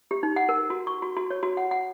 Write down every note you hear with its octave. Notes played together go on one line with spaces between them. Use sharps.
G4
D#4
F#5
A#4
F#4
C#6
F#4
F#4
C#5
F#4
F#5
F#5